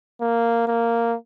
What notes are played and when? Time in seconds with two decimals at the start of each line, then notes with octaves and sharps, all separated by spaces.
0.21 A#3
0.67 A#3